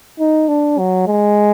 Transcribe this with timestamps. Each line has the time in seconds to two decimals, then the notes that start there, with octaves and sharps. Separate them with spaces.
0.19 D#4
0.48 D4
0.78 F#3
1.07 G#3